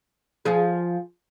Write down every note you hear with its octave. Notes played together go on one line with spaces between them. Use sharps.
F3 G#4